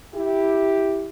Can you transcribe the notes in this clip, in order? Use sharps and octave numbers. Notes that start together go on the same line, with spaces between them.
E4 G4